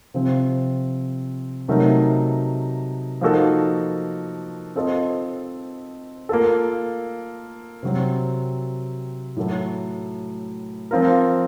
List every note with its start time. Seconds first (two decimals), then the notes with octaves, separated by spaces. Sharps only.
0.14 C3 F3 C4
1.68 C3 F#3 A3 D#4 A#4
3.21 F3 A#3 D#4 F#4 A4
4.75 C4 F4 A4 C5 D#5
6.29 A#3 F4 A4
7.83 C3 F#3 C4
9.37 A2 F#3 A3
10.91 F3 C4 F4 A#4